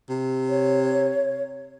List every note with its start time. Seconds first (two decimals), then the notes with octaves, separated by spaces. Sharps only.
0.09 C3
0.49 C#5